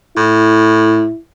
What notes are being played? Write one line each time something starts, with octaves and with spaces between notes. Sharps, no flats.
A2 E4